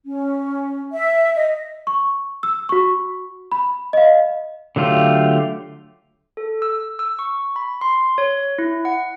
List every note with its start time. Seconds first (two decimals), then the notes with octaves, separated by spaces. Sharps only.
0.05 C#4
0.93 E5
1.35 D#5
1.87 C#6
2.43 E6
2.69 F#4 C#6
3.52 B5
3.93 D#5 F5
4.76 D3 F#3 A3 F4 G4
6.37 A4
6.62 E6
6.99 E6
7.19 C#6
7.56 B5
7.81 C6
8.18 C#5
8.58 E4
8.85 F#5